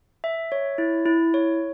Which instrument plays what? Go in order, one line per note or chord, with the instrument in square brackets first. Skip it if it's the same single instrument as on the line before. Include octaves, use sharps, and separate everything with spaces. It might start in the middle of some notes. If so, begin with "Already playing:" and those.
[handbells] E5
C#5
E4
E4
C#5